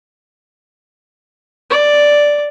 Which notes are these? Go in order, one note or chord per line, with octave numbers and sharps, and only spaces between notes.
D5